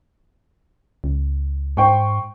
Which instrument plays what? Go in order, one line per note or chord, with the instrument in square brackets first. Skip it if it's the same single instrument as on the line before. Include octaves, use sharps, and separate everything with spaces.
[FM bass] C#2
[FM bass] G#2 [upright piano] C5 G5 C#6